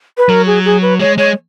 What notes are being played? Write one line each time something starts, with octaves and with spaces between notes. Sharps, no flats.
B4
F#3 A#4
G#4
G#4
B4
G#3 C#5
G#3 C#5